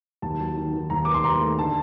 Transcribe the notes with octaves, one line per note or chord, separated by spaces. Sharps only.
D#2 A5
F#3
D#3
D#3
D#2 A#5
D#3 D6
C6
D#2 A#5
A3
D3 A5